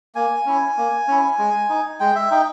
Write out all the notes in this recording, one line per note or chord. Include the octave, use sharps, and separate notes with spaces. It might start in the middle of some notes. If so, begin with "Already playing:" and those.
A#3 G#5
C#4 E4
A#3
C#4 E4
G#3
D#4
G#3 G5
E5
D#4 G5